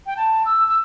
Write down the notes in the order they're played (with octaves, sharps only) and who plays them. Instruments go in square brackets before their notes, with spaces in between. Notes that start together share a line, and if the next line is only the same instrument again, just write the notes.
[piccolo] G5
A5
E6
E6